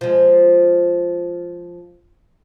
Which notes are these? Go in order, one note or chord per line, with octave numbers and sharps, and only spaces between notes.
F3 G#3